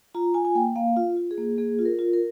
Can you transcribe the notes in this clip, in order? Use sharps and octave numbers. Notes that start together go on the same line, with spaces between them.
F4 A#5
F4 G#5
G#5
A#3 G5
A#3 F5
F4
F4
G#4
A#3
A#3 G#4
F4
A#4
F4
A#4